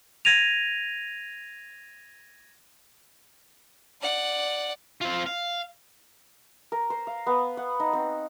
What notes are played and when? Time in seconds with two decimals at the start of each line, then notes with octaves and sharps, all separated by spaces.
0.25 G#6 A#6 D#7 F7
4.01 D5 F#5
5.01 C4 F4
5.27 F5
6.72 A#4
6.90 C5
7.07 F5
7.26 B3
7.57 F#5
7.80 D#4
7.93 C4